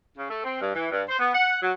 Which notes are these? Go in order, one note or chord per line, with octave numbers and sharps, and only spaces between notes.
C#3
A3
C4
G2
E3
G2
C5
B3
F#5
F#3